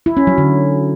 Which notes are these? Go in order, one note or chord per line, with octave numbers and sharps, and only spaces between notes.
E4
C#4
F#3
D3